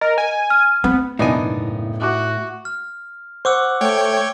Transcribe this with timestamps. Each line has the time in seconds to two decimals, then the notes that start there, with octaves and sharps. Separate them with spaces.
0.01 A#4 D#5
0.18 G#5
0.50 F6
0.84 B3 C4
1.19 F#1 B1 E2 A2 B3 D4 D#4 G#5
2.01 F#4 E5 D6 F#6
2.65 F6
3.45 C5 F#5 C#6 D6 E6
3.81 A3 C#5 G5 G#6